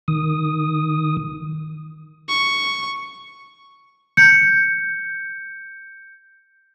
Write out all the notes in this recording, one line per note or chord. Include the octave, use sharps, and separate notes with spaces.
D#3 D#6
C#6
G6 C#7